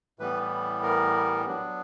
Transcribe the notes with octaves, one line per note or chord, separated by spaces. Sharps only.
A2 E3 G3 B3 B4
A#4
F#3 B3 D4